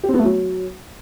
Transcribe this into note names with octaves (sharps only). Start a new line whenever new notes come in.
G4
C4
B3
A3
F#3